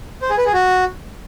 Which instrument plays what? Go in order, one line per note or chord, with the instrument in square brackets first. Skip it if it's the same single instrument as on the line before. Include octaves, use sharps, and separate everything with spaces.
[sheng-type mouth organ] C5
G#4
B4
G#4
F#4